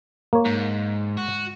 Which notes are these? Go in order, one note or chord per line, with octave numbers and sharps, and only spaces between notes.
A#3 C#5
G#2
F#4